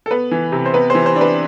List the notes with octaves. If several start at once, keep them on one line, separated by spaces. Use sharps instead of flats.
A4
B3 B4
E3
C3
C5
B3 B4
E3 C5
C5
D4
B4